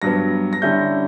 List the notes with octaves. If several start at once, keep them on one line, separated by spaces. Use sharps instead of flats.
G2 F#3 B3 A#6
A#6
D3 G3 C#4 E4 G6